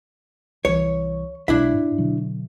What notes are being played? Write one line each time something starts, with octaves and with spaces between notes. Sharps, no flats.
C2 E3 C#5
B1 B2 G#3 D4 E4 E5
G#2
B2 D3 F#3